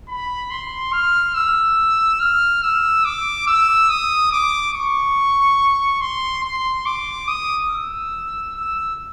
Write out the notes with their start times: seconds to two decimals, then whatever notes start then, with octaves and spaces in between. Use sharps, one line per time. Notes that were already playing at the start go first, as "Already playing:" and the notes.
0.09 B5
0.51 C6
0.93 F6
1.35 E6
2.20 F6
2.63 E6
3.05 D6
3.47 E6
3.89 D#6
4.32 D6
4.74 C#6
6.01 C6
6.43 C6
6.86 D6
7.28 D#6
7.70 E6
8.56 E6